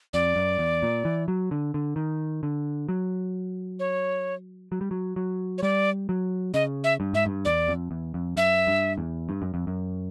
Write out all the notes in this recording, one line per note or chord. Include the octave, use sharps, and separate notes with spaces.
F2 D5
F#2
E2
A#2
E3
F#3
D3
D3
D#3
D3
F#3
C#5
F#3
G3
F#3
F#3
C#5
G3 D5
F#3
C#3 D#5
E5
G2
G#2 E5
G2
E2 D5
F2
E2
F2
F#2 E5
G2
E2
G2
F#2
F2
F#2